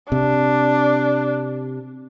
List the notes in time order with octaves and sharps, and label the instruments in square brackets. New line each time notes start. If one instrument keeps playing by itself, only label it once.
[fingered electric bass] C3 [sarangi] D4